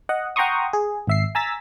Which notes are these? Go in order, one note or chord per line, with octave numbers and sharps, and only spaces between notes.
D#5 F#5
F#5 G5 A#5 C6 C#6 D#6
G#4
G#1 E5 C7
G#5 A#5 E6 A6 B6